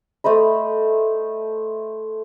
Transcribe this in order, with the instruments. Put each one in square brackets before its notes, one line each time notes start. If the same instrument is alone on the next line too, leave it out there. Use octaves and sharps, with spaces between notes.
[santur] A3 C5 D#5 B5